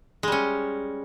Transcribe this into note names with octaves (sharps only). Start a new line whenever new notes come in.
G3 G#3 C#4